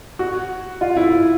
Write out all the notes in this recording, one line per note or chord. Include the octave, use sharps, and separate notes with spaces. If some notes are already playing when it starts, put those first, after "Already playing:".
F#4
F4
E4